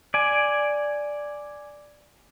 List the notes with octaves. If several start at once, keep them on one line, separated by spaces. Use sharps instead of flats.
D5 G#5